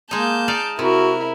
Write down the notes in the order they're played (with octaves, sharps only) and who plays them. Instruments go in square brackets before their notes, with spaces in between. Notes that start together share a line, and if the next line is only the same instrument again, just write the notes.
[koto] G#3 D#4 [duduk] A#3 [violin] A5 G6
[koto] D#4 D5 F5
[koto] C3 [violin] E4 A#4 [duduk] F#4